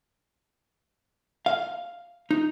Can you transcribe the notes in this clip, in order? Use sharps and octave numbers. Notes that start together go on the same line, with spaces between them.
F5
D#4